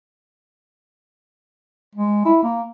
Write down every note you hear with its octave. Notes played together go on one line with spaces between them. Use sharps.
G#3
E4
A#3